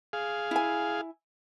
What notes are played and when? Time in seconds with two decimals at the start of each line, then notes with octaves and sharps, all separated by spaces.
0.13 G#4 F5
0.51 E4 G#5